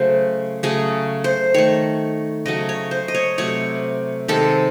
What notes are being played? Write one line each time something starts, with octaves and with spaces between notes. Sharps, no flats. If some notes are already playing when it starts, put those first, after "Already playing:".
Already playing: C#3 F#3 A3 C5
C#3 F#3 A3 G#4
C5
D#3 A3 C#5
C#3 F#3 A3 D#5
C#5
C5
D#5
C#5
C3 F#3 A3 C#5
C3 D#3 G#3 A4